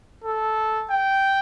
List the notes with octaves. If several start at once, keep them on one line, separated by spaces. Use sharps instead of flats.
A4
G5